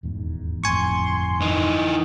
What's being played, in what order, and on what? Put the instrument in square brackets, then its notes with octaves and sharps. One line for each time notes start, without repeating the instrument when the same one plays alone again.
[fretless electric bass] D#1 E2 G#2
[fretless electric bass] G1 F2 A2 [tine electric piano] G#5 C#6 [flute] C6
[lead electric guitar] E3 D#4